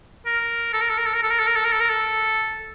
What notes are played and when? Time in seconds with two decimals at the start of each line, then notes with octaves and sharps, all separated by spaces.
0.26 A#4
0.73 A4
0.82 A#4
0.90 A4
0.98 A#4
1.06 A4
1.15 A#4
1.23 A4
1.31 A#4
1.39 A4
1.47 A#4
1.56 A4
1.65 A#4
1.72 A4
1.81 A#4
1.89 A4